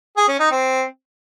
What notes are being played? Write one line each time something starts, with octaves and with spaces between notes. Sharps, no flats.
G#4
C#4
D#4
C4